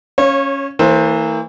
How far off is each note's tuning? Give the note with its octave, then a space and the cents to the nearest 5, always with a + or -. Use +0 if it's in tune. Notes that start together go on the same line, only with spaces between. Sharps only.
C#4 +0 C#5 -25 F5 +0
E3 -25 A#3 -45 C5 +20